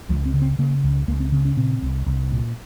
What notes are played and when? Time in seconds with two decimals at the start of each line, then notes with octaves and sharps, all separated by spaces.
0.09 C#2 F3
0.26 C4
0.34 C#3
0.42 C4
0.59 C#3 A#3
0.84 C#2
1.08 C#2 A#3
1.20 C4
1.32 C#3 C4
1.45 C#4
1.57 A#2 C4
1.82 C2
2.06 C2
2.32 A#2